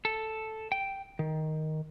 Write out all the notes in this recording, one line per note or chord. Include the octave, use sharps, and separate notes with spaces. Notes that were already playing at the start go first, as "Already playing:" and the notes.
A4
G5
D#3